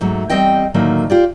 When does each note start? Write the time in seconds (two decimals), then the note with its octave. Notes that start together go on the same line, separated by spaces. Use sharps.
0.01 G#2 F#3 A3
0.30 E2 F3 G3 C4 D#5 G5
0.74 A2 D3 D#3 F#3 A3 A#3
1.10 F4 G4 D5